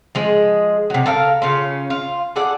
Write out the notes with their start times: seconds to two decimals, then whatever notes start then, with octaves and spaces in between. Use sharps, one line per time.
0.15 F3 G#3 G#4
0.90 C3 F#3
1.06 A4 A#4 F5
1.42 C#3 C#4 F4
1.90 F4
2.36 G#4 A4 D5 F#5